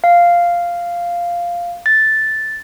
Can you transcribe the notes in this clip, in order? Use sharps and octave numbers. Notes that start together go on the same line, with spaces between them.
F5
A6